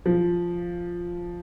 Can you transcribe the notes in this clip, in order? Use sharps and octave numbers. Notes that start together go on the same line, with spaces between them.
F3